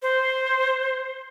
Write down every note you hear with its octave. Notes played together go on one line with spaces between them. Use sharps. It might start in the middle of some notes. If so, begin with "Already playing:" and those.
C5